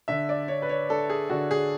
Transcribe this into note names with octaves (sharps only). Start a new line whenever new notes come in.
D3 E5
D5
D4 C#5
B4
C#5
D4 A4
G#4
D3 F#4
G#4